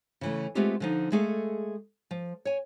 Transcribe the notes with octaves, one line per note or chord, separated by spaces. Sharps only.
C#3 E3 A3
G#3 A3 B3 C4 F4 G4
D3 F3 D#4
G#3 A3 G#4 A4 F5
F3
C#5 G#5